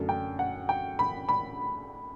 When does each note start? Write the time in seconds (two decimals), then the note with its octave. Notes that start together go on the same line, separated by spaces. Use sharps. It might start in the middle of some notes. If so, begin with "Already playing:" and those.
Already playing: F#2 D3 A3
0.09 G5
0.39 F#5
0.69 G5
0.99 B5
1.29 B5